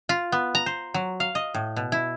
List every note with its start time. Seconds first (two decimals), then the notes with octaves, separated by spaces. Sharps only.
0.09 F4
0.32 B3
0.55 A#5
0.66 C5
0.94 F#3
1.20 F5
1.35 D#5
1.54 A2
1.76 B2
1.92 E4